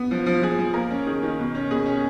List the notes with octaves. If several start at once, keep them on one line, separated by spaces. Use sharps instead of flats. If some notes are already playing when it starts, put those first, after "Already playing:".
Already playing: B3
F3
F3
F3 G#4
F3
A#3 A#4
C#4
D#3 G#4
D#3
B2
C#4
B2 G#4
C#4